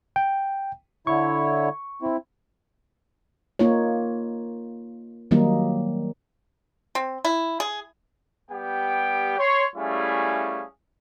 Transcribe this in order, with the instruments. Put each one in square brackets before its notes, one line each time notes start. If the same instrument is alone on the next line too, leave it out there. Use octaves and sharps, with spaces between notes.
[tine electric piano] G5
[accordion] D3 E4 C#5 [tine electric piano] C#6
[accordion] C4 E4
[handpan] A#3 D#4 F4 C#5
D#3 F#3 G3 A#3 D#4
[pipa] C4
E4
G#4
[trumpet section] G3 B3 G4 G5
C#5 C6
G3 A3 C#4 E4 G#4 F5